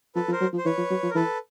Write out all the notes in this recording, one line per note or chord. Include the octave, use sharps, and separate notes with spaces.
F3 A4 B4
F3
A#4 C5
F#3
F3
C5
E3 B4 C#5
F3
F#3
F3
A#4
E3 A4 B4